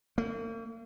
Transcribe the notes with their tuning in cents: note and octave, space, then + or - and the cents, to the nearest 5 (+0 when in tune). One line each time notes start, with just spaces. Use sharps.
A#3 -40